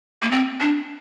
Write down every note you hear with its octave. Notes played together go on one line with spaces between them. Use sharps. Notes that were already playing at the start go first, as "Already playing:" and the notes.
A#3
C4
D4